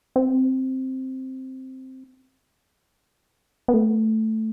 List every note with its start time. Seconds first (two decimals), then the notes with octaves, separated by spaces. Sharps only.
0.16 C4
3.68 B3
3.74 A3